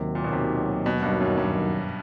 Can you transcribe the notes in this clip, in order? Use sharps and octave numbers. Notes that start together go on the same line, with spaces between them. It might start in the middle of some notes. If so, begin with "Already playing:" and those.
Already playing: D#2 C3 D#3 F#3
A#2
B2
C3
B2
G2
F#2
G2